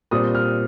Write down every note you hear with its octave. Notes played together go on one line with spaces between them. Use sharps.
A#2 G3 C4 D#6
F6